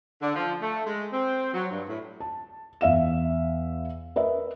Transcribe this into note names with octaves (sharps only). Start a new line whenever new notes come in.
D3
F3
A3
G#3
C4
F#3
G2
A2
A5
E2 E5 F5 E7
A#4 B4 D#5 E5